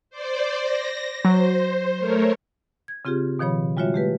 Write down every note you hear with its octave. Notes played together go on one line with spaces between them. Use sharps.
C5 D5
A#6
F#3 C5
A3 A#4 C#5
G#6
C#3 C4 F4 G4 G#4
B2 D#3 F3 C#5 B5
G3 G#3 F4 F#4 C#5 E5
A3 G4 B4